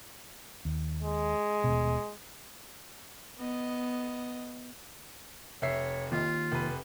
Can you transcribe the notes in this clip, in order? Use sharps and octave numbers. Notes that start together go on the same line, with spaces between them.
D#2
G#3
D#1 B2
B3 D#5
F1 C#5 E5 C7
D#2 F4
F1 B4